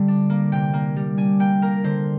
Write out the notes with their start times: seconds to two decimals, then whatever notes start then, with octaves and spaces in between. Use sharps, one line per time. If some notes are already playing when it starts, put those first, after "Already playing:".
Already playing: D3 G3
0.08 D4
0.30 A#3
0.52 C3 G5
0.73 A#3
0.96 G3
1.17 D4 G#5
1.39 A#3 G5
1.62 A#3 A#4
1.84 D3 C5